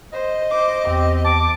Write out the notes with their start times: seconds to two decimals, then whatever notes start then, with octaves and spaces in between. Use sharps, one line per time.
0.13 C5 D#5
0.50 C5 D6
0.87 E2 C4 G4
1.24 A5 D6